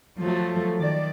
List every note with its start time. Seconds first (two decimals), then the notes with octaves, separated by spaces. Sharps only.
0.19 F3 F#3 A3
0.79 D#3 D5